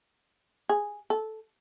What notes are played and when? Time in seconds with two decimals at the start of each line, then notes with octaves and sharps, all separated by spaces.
0.69 G#4
1.10 A4